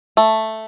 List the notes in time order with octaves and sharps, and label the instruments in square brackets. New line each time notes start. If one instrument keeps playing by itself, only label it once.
[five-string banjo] A3